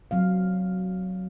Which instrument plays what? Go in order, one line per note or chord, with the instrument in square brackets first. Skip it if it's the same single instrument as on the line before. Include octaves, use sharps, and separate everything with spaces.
[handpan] F#3 C4 F5